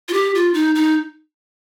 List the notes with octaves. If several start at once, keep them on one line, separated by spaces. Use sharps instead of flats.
F4
G4
F4
D#4
D#4